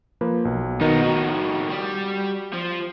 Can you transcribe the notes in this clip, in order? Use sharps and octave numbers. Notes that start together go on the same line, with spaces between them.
F3 A#3 B4
B1
B2 D#3 B3 D#4
A2 D#3 F#4
G3
F3